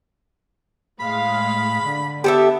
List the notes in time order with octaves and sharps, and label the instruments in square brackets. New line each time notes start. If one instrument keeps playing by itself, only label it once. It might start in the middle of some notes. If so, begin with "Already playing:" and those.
[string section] A2 G#3 F5 [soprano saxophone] B5
[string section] D3
[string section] B3 [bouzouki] G4 A4 E5